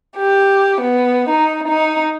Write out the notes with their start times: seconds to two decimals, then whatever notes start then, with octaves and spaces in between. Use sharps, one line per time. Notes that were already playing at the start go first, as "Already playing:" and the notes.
0.16 G4
0.80 B3
1.29 D#4
1.67 D#4